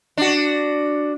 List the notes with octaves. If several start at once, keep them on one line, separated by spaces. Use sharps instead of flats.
D4 F#4